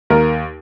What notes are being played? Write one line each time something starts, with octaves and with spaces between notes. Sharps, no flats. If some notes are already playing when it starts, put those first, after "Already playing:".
D#2 A#4